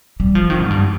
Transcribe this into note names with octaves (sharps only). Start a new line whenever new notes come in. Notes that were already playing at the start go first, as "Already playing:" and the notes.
G3
F3
D#3
G#2
G2